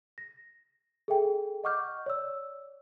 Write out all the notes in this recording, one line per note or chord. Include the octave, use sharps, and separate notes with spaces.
A#6
G#4 A4 E5 G5 G#5
D#5 F#5 C#6 D6 F6 G6
C#5 D5 E6